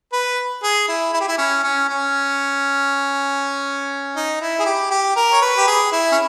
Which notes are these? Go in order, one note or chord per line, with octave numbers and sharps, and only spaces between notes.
B4
G#4
E4
E4
G4
E4
C#4
C#4
C#4
D#4
E4
G#4
G4
G4
A#4
C#5
B4
G4
G#4
E4
C#4